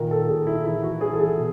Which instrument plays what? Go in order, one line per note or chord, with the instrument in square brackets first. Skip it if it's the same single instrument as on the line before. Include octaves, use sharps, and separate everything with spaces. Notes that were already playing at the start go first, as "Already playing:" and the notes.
Already playing: [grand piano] A#2 D#3 A#4
A4
A#2 G#4
E4
E3 E4
F#4
E3 G#4
A4
G#4
B2